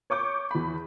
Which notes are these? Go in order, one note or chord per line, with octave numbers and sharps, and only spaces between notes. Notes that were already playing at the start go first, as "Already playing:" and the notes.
C#5 C#6 D6 G6
E2 B5